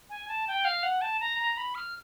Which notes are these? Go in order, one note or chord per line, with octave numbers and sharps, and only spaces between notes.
G#5
A5
G5
F5
F#5
A5
A#5
A#5
B5
F6